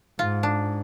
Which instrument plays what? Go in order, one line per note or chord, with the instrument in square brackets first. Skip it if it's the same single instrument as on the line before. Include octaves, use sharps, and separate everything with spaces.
[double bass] G#2 [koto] F4
[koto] D4